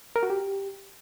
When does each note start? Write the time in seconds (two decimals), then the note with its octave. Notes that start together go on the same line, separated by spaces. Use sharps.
0.16 A#4
0.23 F#4
0.30 G4